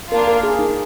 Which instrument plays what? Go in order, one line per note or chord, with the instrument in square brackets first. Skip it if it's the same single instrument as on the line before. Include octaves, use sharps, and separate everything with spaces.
[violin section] A#3 D4 F4 [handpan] A#4
[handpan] A#4
G#4
D#4